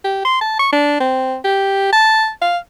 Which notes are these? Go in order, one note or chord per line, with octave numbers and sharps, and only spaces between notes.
G4
C6
A5
C#6
D4
C4
G4
A5
F5